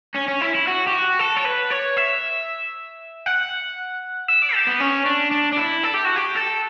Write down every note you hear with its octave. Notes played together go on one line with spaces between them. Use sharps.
C#4
C#4
E4
E4
F#4
G4
F#4
A4
C#5
B4
C#5
E5
F#5
E5
D5
G4
B3
C#4
D4
D4
D4
E4
A4
G4
F#4
G4
A4